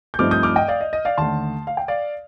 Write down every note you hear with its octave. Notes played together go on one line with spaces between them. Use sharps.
G6
G2 F3 A3 C4 D#4 D6 F6
D#6 G6
D6 F6
D#5 G5
D5 F5
D#5
D#5
D5 F5
D#2 D3 A3 A5 C6
F5
G5
D5 F5